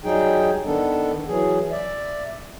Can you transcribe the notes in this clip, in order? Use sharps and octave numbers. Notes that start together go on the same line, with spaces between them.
F#3 G3 D#4 G#4 G5
D#3 B3 D4 A4
E3 F#3 G#4
D5 E5